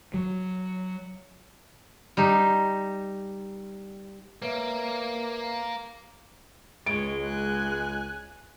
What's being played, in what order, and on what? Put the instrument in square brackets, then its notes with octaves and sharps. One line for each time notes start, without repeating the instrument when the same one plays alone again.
[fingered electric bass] F#3
[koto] G3 D#4
[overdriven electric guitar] A#3 [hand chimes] B4 C#5 E5
[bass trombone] C#2 [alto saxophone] G#3 [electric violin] C#5 [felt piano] D7
[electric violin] G#5 F#6